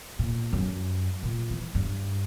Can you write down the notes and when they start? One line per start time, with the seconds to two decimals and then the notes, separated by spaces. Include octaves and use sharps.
0.19 A#2
0.53 F#2
1.23 A#2
1.50 E3
1.75 G2